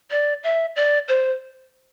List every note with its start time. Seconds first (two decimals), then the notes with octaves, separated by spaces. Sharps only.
0.11 D5
0.44 E5
0.76 D5
1.08 C5